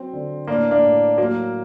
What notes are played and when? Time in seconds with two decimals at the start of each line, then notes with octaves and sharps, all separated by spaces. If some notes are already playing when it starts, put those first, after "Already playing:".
Already playing: F#3 C4
0.13 D3
0.48 A2 A#3 D4
0.71 A#3 D4
0.84 A2
1.18 F#3 A#3